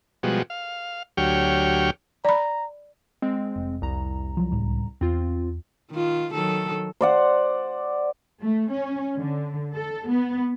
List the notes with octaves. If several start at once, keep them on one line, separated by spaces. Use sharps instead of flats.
B2 F3 G3 G#3 F#4
F5
D2 F#3 G4 C#5 G5 F6
D5 A#5 B5
G#3 C4
F1
C2 A#5
F3 F#3
C#2 A2 G3
E2 C4 F4
D#3 F4
D#3 F#3 A4
C5 D5 F#5
A3
C#4
D3
A4
B3